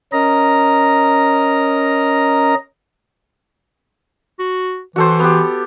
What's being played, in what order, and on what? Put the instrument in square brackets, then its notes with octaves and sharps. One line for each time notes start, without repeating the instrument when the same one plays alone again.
[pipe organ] C#4 A#4 D#5 A#5
[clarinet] F#4
[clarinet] E3 [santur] F#4 A4 C5
[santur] B3 G4